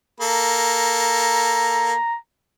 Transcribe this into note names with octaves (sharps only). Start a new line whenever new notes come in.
A#3 A4 A#5